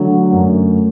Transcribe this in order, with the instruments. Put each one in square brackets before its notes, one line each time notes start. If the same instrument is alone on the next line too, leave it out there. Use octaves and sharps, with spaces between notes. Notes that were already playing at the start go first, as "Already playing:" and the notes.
Already playing: [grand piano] D3 F#3 [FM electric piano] A3
[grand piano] F#2